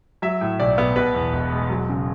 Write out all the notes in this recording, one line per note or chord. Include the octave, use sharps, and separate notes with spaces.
F#3 E5
A2
B1 D5
B3
B2 B4
E2
E1
G#3
F#3
C#3